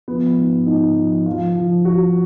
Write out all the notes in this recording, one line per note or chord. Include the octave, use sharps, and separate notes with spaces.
F3 B3
G#2
G#2 D#4
F3
F3 F4
F3
F3 F#4